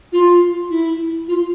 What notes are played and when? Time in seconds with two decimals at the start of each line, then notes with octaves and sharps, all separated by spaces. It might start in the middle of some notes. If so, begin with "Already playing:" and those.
0.12 F4
0.70 E4
1.28 F4